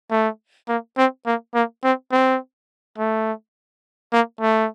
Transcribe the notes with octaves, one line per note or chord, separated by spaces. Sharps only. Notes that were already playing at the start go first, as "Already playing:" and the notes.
A3
A#3
C4
A#3
A#3
C4
C4
A3
A#3
A3